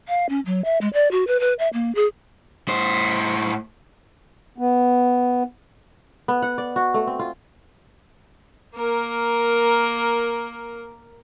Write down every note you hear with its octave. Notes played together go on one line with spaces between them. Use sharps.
F5
C#4
F#3
E5
G#3
D5
F#4
B4
B4
E5
A#3
G#4
A2 C5
B3
B3
F#5
D5
F#4
A3
C4
F4
A#3 A#4